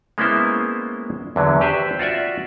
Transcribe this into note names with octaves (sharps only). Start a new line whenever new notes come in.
G#3 A#3 B3 C#4 E4 C5
E2 D3 F#3
G4 B4 C5 E5
F4 F#4 D5 E5